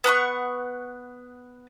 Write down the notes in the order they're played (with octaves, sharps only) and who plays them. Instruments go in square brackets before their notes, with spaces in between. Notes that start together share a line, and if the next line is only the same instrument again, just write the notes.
[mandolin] B3 F#5 A#5 C#6